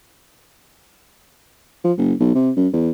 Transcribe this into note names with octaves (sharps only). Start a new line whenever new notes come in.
F3
F#1
B1
C3
F#2
E2